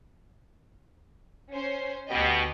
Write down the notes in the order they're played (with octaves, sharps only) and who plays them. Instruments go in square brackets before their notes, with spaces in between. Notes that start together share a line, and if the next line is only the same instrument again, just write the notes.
[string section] C#4 C5
[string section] D2 G4 D#5 [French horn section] B2